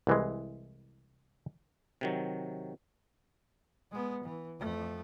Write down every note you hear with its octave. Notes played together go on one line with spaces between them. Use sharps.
C2 E3 G#3
C3 D#3 F#3
G#3 B3
E3
F2 A3